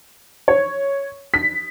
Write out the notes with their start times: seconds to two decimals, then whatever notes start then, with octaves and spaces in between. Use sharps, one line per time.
0.48 C#5
1.34 B6